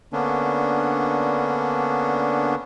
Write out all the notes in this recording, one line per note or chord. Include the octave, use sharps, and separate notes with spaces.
D3 A#3 B3 C#4 D4